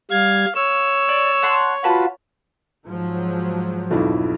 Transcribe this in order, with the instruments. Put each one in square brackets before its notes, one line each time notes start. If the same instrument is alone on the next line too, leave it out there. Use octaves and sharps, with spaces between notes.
[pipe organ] G3 G#6 [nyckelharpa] F5
[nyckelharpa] C#5 [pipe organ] E6
[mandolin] D5
F#5 A5 C6
[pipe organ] F4 F#4 [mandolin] B4 A5 B5
[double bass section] G#2 F3 F#3
[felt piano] B1 F2 E4